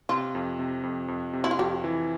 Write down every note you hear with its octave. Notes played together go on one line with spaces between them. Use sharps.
C3 F4
F2
C3
F2
F2
C3
E4
F4
F2 G4
E3